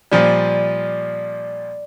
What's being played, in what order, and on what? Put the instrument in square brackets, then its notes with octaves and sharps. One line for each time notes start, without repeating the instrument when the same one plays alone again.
[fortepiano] A#2 F3 G3 [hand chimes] D5